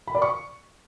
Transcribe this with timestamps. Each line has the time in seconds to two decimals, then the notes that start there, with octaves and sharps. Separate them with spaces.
0.07 B5
0.15 D5
0.22 C#6